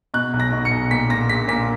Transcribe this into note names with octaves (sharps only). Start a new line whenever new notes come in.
B2 F#6
B1
A#6
B2
C#7
B1
A#2 B6
A#2 A#6
A#1 B6
A#2 B6